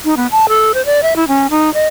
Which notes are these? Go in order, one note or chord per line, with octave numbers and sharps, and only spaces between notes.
D#4
B3
A5
A4
C5
D5
E5
E4
C#4
D#4
D#5